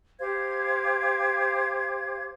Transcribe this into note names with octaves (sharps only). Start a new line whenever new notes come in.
G4 C5 F5 G#6